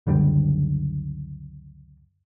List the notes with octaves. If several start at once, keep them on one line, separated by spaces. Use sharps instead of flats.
C#2 F#2 D3 G3